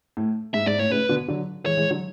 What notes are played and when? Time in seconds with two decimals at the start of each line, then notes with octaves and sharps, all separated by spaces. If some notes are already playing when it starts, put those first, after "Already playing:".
0.17 A2
0.54 G#2 E5
0.66 G#2 D5
0.78 A2 C#5
0.91 A2 C#3 B4
1.09 B2 D3
1.28 D3 F#3
1.65 E3 G#3 C#5
1.77 E3 G#3
1.90 D3 F#3